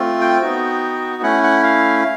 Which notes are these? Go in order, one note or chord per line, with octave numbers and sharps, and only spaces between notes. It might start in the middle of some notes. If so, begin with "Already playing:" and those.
Already playing: A3 C4 F4
G5
B3 D#4 F#4
A3 C#4 E4 F#5
F#5
F5